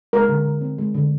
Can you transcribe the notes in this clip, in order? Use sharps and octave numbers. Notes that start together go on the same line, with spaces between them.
G#3 A#4
D3
D3
C4
G#3
D3